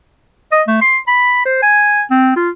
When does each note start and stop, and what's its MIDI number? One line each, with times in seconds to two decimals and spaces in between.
0.52 0.62 75
0.67 0.78 57
0.81 0.98 84
1.07 1.43 83
1.45 1.61 72
1.62 2.02 80
2.11 2.36 60
2.36 2.50 65